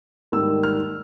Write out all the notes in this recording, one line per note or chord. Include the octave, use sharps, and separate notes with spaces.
G#2 D#3 G3 A#3 E6
F6